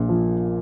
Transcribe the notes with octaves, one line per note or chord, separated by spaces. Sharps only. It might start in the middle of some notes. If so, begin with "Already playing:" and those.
Already playing: A#1 A#2
F3